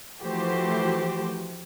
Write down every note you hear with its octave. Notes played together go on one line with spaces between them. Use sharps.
E3 F3 A3 F#4 G4 C5